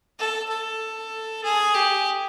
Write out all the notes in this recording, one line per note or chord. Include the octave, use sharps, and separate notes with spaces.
A4
A4
G#4
G4